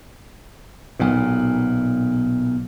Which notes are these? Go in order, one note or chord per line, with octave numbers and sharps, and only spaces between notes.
B1 A#2